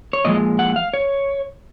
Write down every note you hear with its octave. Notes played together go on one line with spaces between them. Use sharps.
C#5
A#2 F3 G#3 D#5
F#5
F5
C#5